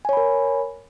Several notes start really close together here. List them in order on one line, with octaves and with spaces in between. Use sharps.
G#5 C#5 B5 A#4